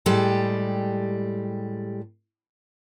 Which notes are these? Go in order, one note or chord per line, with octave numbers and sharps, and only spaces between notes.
A2 G3 G#3 G4 A4 A5